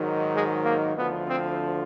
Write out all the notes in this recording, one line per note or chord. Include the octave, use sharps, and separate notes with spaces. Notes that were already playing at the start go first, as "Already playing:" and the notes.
Already playing: G#2 D#3 F#3
G#3
A#3
D2 D3 F3 B3
C4